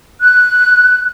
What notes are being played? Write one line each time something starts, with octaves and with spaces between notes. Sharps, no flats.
F#6